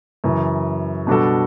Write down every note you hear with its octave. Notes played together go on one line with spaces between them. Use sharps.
F#2 C#3 E3
B2 G3 D4 F#4 A4